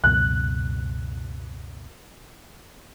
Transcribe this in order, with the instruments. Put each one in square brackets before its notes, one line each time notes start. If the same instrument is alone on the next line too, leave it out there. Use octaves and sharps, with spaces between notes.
[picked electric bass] C#2 F#2 B2 [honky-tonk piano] F#6